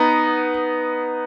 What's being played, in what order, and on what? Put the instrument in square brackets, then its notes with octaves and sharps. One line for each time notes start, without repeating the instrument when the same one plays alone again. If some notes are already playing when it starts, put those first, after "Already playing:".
Already playing: [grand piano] B3 D#4